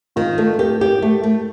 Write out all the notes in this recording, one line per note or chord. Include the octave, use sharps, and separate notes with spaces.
D#3 F4
A3 A4
G4 A#4
G4
A3
A3